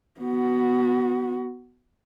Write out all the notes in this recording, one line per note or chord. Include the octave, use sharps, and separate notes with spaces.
B3 F#4